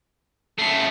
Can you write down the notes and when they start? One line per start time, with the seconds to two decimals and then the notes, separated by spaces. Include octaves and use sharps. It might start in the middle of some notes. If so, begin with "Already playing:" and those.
0.59 C#3 A3 C7